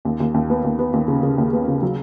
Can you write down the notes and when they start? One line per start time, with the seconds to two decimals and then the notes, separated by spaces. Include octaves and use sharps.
0.05 D#2
0.20 D#2
0.34 D#2
0.50 B3
0.64 D#2
0.79 B3
0.93 D#2
1.08 C#3
1.23 C#3
1.38 D#2
1.53 B3
1.68 C#3
1.82 F#3